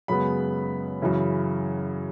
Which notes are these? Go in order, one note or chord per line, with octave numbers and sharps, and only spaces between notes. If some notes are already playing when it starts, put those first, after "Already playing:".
F#2 C#3 G#3 B3 B5
F#2 C#3 E3